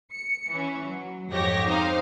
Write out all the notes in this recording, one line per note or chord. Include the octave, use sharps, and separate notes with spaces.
C#7
E3 C#4
F#3
F2 G#2 G4 C#5 A#6
C4 D#4 C5 F5